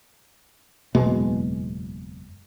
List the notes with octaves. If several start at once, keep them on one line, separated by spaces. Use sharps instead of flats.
F#1 E2 B2 G#3